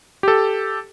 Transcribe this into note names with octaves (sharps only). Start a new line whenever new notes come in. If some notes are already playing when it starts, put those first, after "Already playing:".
G4 A4